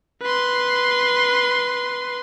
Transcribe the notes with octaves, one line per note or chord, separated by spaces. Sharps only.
B4 C6